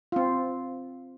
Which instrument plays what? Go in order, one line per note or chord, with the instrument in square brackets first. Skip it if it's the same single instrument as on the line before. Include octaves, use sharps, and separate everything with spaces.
[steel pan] C4 F4